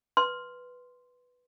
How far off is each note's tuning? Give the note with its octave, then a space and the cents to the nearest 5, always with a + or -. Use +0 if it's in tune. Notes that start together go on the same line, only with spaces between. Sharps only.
B4 +0 C6 +0